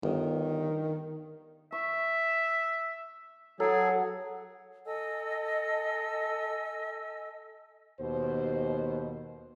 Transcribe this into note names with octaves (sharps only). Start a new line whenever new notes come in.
G1 D#3
E5 C#6
F#3 G#4 A4 F#5 A#5
A4 D#5 G#5 E6
D#2 B2 C5